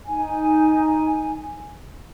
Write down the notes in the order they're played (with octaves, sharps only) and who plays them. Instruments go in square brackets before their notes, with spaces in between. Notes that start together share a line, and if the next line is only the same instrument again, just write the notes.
[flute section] D#4 G#5